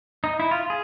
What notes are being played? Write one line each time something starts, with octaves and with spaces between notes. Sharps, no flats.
D#4
E4
F4
G#4